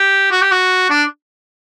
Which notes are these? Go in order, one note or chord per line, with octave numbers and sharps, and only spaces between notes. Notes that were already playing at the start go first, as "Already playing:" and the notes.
Already playing: G4
F#4
G4
F#4
D4